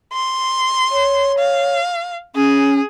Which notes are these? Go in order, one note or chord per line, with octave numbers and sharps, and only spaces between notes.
C6
C#5
F5
C#4 G#4